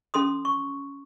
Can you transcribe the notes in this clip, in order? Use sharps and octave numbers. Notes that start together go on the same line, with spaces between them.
C#4 A4 C6 D#6
C#6